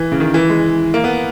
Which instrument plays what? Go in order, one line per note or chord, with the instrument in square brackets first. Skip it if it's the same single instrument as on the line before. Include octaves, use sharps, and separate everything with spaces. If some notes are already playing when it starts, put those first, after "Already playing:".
Already playing: [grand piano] E3
C#3
D#3
E3
G#3
A#3
B3